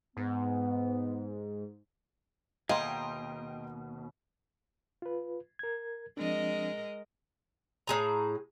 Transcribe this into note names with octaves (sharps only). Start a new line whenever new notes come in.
G#2 B3
D#2 B2 G#4 D#5 F5 G5 A#5 C6
F4 B4
A#4 G#6
F3 G#3 C4 D4 A#4 D#5
A2 G#4 A#5